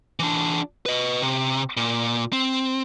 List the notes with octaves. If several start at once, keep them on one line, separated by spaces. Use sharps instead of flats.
E3 D4
B4 D#5
C3
A#2
C4